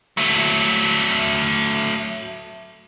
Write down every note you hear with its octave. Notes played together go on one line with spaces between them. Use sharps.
F#3 A3